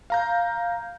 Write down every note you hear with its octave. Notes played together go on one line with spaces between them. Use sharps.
F5 A#5 G6